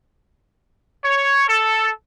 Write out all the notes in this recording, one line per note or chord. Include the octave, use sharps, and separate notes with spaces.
C#5
A4